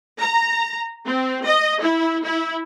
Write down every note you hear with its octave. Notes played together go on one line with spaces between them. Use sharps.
A#5
C4
D#5
E4
E4